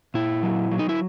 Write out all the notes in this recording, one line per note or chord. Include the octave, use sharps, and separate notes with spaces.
A#2 E4
F#3
F#3
D#4
E4